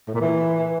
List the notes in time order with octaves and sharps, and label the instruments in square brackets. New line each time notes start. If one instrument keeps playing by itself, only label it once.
[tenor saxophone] A2
A#2
E3